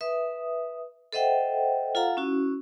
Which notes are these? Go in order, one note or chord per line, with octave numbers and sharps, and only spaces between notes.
B4 E5 D#6
A4 C5 D#5 E5 F#5 G5
F4 A4 F5 F#5 A#5
C#4 E4 F#4